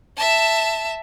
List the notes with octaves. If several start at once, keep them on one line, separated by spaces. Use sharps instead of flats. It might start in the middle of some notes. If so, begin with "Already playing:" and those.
E5 A5